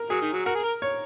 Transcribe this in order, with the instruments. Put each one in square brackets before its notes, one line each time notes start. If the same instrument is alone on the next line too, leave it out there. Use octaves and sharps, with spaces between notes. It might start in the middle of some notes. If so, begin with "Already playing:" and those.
Already playing: [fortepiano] A#4
[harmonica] F#3 [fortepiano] G#4
[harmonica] D#3
F#3
[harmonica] F#4 [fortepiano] A#4
[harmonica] G#4
A#4
[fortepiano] C#5